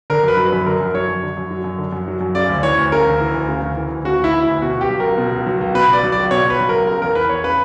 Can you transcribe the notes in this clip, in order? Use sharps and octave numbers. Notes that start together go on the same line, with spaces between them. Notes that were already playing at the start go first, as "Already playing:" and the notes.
D3 A#4
F#2 B4
F#3
B4
F#2
D3 A#4
F#2
F#3 C#5
F#2
D3
F#2
F#3
F#2
D3
F#2
F#3
F#2
C#3 D5
D2
E3 C#5
D2
C#3 A#4
D2
E3
D2
C#3
D2
E3
D2
C#3 F#4
D2 E4
E3
E4
D2
B2 F#4
C#2
G4
F#3
C#2 A#4
B2
C#2
F#3
C#2
B2 B4
C#2 D5
F#3
D5
C#2
B2 C#5
C#2 B4
F#3
C#2 A#4
C#3 A#4
E2 A#4
E3 B4
E2 C#5
C#3 B4